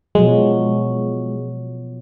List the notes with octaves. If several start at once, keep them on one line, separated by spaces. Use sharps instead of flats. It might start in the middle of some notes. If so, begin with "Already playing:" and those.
B2 F3 F#3 G#3